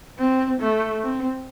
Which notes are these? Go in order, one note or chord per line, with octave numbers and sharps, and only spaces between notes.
C4
A3
C4